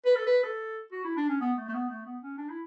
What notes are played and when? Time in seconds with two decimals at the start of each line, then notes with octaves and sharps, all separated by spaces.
0.05 B4
0.16 A4
0.27 B4
0.43 A4
0.92 F#4
1.04 E4
1.17 D4
1.29 C#4
1.41 B3
1.57 A3
1.68 A3
1.74 B3
1.90 A3
2.06 B3
2.22 C#4
2.38 D4
2.49 E4